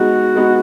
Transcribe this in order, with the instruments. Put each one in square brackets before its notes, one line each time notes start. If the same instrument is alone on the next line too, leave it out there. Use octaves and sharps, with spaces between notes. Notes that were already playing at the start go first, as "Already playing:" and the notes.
Already playing: [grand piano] G#3 B3 D#4 [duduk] F#4
[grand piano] G#3 B3 D#4